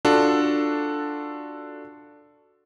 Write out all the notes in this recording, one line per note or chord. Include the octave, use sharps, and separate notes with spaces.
D4 F4 F#4 A4